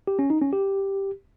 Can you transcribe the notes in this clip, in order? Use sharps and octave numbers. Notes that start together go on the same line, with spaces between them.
G4
C#4
D#4
C#4
G4